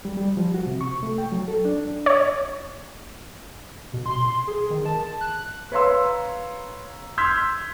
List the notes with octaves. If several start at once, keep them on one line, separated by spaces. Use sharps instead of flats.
G3
G3
F3
F#4
C3
C#6
A3
G5
F#3
A4
D4
C#5
B2
C6
G#4
D#3
A5
F#6
B4 C#5 F5 A#5 C6 E6
C6 E6 F6 G6 G#6 B6